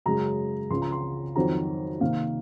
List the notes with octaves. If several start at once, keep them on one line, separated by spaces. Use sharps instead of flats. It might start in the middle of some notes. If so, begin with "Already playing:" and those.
F#2 C#3 G#3 A#5
C#2 C#3 F3 C6
A#5
C6
F2 D#3 F#3 C4 A#5
C3 D#3 A#3 F5